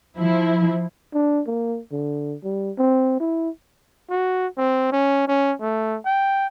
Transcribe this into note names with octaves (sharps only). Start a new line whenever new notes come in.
F3 E4
D4
A#3
D3
G3
C4
E4
F#4
C4
C#4
C#4
A3
G5